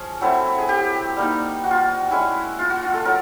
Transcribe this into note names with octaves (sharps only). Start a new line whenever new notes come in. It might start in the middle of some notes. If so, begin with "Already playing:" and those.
Already playing: F3 C#4 G#4
F#3 A3 C4 E4
G#4
G4
G3 A#3 D#4
F#4
F4
F#4
G#3 C#4 E4
F4
F#4
F4
A4
F#3 A#4